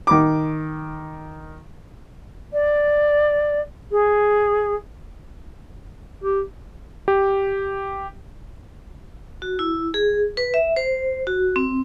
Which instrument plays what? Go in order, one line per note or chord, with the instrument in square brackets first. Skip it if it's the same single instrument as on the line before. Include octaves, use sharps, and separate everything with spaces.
[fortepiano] D#3 D6
[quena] D5
G#4
[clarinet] G4
[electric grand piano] G4
[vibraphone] F#4
E4
G#4
B4
E5
C5
F#4
C4